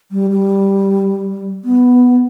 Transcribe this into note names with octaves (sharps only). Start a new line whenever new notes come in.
G3
G3
B3